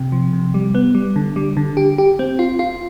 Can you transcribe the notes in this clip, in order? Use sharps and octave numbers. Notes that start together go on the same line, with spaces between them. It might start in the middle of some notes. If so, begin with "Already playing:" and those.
Already playing: C3
F3
C3
G3
B3
G3
D3
G3
D3
G4
G4
C4
F4
F4